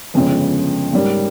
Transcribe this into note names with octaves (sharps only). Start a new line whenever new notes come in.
G1 F2 C#3 G#3
G#2 G3 A#3 C#4